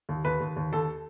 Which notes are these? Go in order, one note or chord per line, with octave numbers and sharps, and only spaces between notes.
D#2
D#2 B4
D#2
D#2
D#2 A4